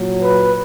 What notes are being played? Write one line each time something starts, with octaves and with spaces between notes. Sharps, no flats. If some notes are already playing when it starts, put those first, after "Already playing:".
Already playing: A#2 F#3
B4